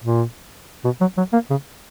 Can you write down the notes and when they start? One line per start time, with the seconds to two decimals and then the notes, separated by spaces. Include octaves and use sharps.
0.04 A#2
0.85 B2
1.01 F#3
1.17 F#3
1.33 A#3
1.50 C#3